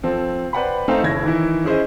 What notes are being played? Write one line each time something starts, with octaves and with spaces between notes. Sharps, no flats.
F3 C4 A4
B4 C5 D5 F#5 G5 B5
A3 C4 D#4 A4 F5 G5
F#1 B1 E4 C#5 G#6 A#6
D#3 E3 E4
C#4 E4 G#4 C5 D#5